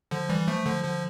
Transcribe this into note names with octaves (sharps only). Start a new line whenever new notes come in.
D3 F3
E3 G3
F3 A3
D3 F3
D3 F3